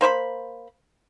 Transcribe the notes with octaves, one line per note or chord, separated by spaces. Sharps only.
A#3 C5 C#5 B5